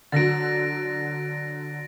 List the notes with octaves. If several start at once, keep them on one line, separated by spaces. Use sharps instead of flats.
D3 F#3 A6 A#6 D7